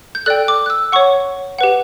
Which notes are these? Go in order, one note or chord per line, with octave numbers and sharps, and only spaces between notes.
G6
A4 D5 G5 F#6
D6
F#6
E6
C#5 F#5 C#6
G4 B4 F#5